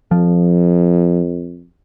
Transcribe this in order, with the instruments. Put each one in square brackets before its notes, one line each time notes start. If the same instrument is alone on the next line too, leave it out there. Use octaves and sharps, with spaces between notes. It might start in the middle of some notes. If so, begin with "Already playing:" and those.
[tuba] F2 [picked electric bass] F3